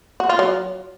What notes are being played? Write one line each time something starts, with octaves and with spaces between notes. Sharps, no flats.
F#4
F4
F#3